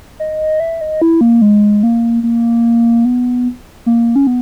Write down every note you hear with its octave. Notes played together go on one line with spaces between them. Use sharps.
D#5
E5
D#5
E4
A#3
G#3
A#3
A#3
B3
A#3
C#4
B3